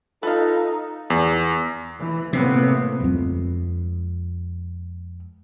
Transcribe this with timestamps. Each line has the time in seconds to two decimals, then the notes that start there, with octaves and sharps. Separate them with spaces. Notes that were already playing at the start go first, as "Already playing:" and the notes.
0.23 D#4 F4 A4 B4 F5
1.10 E2
1.99 E3
2.33 A2 C3 A#3 B3
3.00 F2 G#3